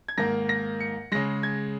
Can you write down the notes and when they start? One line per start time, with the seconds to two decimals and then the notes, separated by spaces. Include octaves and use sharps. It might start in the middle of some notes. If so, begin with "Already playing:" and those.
0.08 G#6
0.18 G#2 D#3 A#3 A#6
0.49 A#6
0.81 C#7
1.12 C#3 G#3 A#6
1.43 G#6